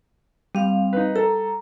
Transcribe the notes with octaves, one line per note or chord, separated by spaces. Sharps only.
G3 C4 F5
D#4 B4
A4 A#5